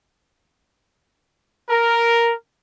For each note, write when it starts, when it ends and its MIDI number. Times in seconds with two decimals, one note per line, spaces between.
1.69 2.32 70